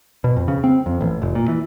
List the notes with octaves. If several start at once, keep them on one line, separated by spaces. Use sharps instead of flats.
B2
F2
C#3
C4
F2
A1
F1
A#2
E3